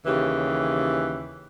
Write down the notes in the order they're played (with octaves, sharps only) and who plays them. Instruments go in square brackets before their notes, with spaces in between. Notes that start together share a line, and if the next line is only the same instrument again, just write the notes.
[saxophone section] D#2 C#3 E3 G4